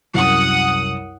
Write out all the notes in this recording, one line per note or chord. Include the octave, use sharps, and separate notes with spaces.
C2 F#2 F#5 D#6